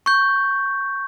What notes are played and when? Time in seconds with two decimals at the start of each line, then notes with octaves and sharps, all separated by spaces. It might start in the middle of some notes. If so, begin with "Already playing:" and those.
0.06 C#6 G6